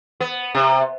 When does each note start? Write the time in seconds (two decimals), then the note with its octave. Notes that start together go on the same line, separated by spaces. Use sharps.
0.20 B3
0.55 C3